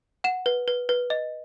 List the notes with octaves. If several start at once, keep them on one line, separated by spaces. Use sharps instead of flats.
F#5 E7
B4
B4
B4
D#5